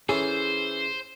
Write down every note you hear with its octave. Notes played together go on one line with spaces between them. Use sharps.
E3 C#4 G#4 A4 C5